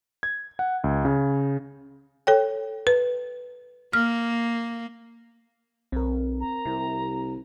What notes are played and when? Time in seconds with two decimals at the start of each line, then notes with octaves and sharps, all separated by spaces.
0.23 G#6
0.59 F#5
0.84 C#2
1.05 C#3
2.27 A4 C#5 G5
2.87 B4
3.93 A#3 F6
5.92 B1 C4 A#4
6.40 A#5
6.65 C2 C3